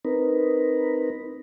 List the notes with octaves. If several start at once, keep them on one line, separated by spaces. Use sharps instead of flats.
C4 D#4 A#4 B4